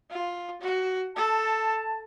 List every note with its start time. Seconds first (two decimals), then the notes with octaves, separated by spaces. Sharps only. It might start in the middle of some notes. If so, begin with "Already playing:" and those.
0.10 F4
0.61 F#4
1.16 A4 A5